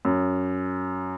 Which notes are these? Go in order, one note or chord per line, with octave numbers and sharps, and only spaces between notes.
F#2